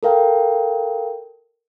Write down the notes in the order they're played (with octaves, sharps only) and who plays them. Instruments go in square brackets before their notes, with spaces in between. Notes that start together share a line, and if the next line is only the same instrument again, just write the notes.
[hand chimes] A4 A#4 F5 G5